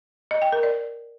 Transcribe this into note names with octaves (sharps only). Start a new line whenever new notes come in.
D#5
G5
A#4
D5